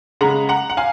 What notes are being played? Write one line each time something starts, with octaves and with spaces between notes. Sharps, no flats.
C#3 G#3 F#5 A#5
F#5 A#5
F#5
F5 G#5